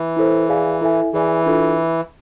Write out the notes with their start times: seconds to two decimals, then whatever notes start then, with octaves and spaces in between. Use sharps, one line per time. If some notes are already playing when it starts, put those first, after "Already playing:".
Already playing: E3
0.17 E4 A4 C5
0.49 G#4 D5 F5 G#5
0.81 E4 A4 E5 G#5
1.14 E3 G#4 D5 G#5
1.46 D4 F4 A4